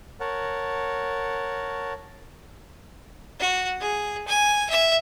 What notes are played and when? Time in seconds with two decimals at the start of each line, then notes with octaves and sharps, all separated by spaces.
0.20 A#4 C#5 F#5 A5
3.40 F#4
3.81 G#4
4.28 G#5
4.70 E5